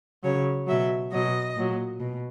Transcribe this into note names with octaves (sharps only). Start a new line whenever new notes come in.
C#3 F#3 C#5
B2 F#3 E5
B2 F#3 D#5
A#2 F#3
B2